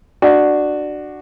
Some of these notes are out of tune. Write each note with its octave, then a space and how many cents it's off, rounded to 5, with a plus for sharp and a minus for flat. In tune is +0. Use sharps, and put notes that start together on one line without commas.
D4 +15 F#4 +0